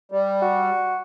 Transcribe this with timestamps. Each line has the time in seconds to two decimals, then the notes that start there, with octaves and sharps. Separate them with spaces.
0.12 G3
0.42 F#4